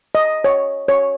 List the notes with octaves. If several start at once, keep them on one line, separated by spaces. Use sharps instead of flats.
D#5
C#5
C#5